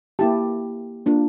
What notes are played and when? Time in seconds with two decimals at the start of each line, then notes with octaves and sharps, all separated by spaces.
0.19 A#3 E4 G4 A5
1.06 A#3 D4 F4